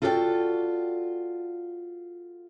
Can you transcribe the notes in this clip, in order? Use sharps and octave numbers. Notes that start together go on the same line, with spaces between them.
F4 F#4 A4 D5 D#5 G5